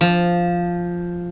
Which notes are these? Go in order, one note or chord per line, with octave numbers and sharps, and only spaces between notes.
F3